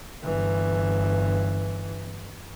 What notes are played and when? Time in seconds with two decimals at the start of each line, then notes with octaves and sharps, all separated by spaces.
0.25 G1 E3